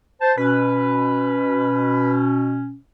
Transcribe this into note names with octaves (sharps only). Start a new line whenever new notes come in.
C5 A5
B2 C#4 B4